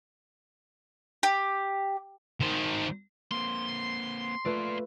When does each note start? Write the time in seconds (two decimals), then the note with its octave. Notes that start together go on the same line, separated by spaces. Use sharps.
1.23 G4
2.41 D#3 C5
3.31 A#3 C4 C6
4.45 A3 A#3 F4 B4 D5